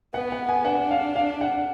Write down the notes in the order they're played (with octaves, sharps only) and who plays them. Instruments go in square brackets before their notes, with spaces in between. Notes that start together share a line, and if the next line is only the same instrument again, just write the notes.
[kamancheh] B3 [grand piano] F#5
[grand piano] F#5
G#5
[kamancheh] D4 [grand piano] F#5
[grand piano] F5
F5
F#5